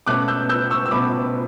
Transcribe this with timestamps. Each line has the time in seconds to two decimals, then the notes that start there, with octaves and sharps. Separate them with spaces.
0.06 B2 A3 C#4 D6 F#6
0.28 E6 G6
0.49 E6 G6
0.71 C#6 E6
0.86 E6
0.91 B2 A3 C#4 B5 D6